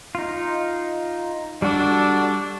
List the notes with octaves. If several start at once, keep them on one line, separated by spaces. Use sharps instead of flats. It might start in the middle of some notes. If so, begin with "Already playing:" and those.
D#4 F4
G3 D4 F#4 A4